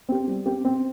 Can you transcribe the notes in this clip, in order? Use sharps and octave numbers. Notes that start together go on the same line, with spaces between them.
C4 G4
G3
C4 G4
C4